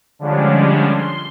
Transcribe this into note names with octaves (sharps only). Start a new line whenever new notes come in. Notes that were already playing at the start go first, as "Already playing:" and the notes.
D3 F3 G3 G#3 C#4 D4
C6